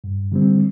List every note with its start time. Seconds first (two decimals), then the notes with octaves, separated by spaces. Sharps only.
0.04 G2
0.32 D3 G3 C4